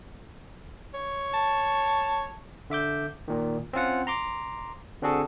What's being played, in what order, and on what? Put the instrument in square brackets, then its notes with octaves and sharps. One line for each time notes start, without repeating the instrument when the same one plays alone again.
[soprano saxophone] C#5
[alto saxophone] A5
[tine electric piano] D3 E5 D6 G6
A#2 D#3
C4 C#4 F4 F#5
A#5 C6 D6
D3 C4 D4 F#4 G#4 A4